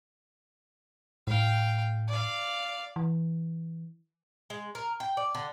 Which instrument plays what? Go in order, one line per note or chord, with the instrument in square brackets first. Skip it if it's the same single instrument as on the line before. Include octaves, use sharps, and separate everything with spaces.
[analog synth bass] A2 [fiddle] F5 G5
[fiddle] D5 F5
[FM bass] E3
[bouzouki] G#3
A#4
G5
D5
D3